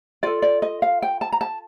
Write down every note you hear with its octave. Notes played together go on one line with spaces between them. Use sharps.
F4 A4 D5
D5
D#5
F5
G5
A5
A#5
A5